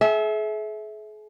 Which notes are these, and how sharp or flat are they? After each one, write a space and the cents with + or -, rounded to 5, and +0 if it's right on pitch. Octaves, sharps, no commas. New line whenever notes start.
G#4 +45 E5 -15